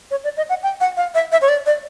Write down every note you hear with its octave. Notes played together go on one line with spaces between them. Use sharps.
C#5
D5
D#5
F#5
G5
F#5
F5
E5
E5
C#5
D5
D5